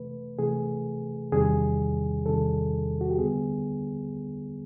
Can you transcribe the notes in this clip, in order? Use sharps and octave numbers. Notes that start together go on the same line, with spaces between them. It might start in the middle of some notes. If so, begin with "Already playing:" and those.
Already playing: C3 E3 A3 B4
C3 E3 A3 G#4
E2 C3 D#3 G3 G#4
E2 C3 D#3 G3 A4
F#4
G4
D2 D3 G3 B3 G#4